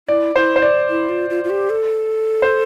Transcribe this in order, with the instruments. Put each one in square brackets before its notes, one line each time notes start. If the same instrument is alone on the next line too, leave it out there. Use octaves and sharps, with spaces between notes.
[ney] E4 [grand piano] D5
[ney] E4 [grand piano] C5
[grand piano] C5
D5
[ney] E4
F4
F4
F4
G4
A4
[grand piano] C5